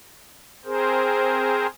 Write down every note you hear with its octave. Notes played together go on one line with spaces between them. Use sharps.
C4 G#4 A#4 C5